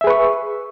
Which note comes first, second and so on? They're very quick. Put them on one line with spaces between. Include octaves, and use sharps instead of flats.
E5 G#4 B4 C#6